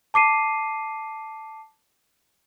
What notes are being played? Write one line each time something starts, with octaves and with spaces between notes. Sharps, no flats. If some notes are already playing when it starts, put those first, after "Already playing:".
A5 D6 C7 D#7